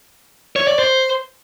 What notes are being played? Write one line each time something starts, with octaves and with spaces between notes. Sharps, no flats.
C#5
D5
C5